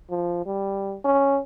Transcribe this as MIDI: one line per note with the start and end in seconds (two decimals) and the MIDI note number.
0.10 0.43 53
0.46 0.96 55
1.04 1.40 61